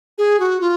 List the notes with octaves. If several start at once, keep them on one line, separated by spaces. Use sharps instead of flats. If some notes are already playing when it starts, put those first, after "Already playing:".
G#4
F#4
F4